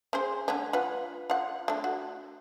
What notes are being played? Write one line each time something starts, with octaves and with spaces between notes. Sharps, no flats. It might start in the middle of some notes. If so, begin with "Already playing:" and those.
C#4 G#4 C5
D3 A3 C#4
F4 B4 F#5
F4 F#5
A3 D4
F#4